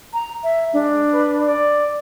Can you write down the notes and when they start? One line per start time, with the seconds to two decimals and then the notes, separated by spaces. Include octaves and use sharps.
0.14 A#5
0.44 E5
0.73 G#3 D4
1.13 B4
1.46 D5